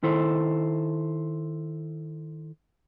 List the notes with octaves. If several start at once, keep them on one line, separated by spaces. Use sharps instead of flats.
D#3 E4 A4 C5